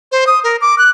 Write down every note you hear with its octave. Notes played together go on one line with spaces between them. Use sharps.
C5
D#6
A#4
D6
F#6